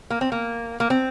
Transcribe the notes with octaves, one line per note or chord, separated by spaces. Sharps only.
A#3
C4
A#3
A#3
C4